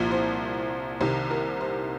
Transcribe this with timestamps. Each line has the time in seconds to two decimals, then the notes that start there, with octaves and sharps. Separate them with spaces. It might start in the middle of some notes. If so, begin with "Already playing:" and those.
Already playing: C2 A#2 F3
0.11 C5
1.01 C2 C3 D#3 C5
1.31 A#4
1.61 C5